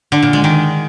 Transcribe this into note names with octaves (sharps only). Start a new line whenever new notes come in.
D3
A#2
G#3
D#3